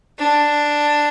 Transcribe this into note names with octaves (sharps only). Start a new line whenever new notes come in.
D4